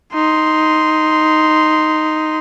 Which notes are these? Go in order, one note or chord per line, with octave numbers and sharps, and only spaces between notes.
D#4 C6